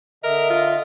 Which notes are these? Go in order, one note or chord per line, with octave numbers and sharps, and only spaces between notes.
D3 A#4 D#5 E5
F4